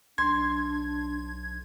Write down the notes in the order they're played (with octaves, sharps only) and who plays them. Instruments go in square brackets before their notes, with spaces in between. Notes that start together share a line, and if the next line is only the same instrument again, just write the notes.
[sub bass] B1 [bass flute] D4 [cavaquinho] C6 [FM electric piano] G#6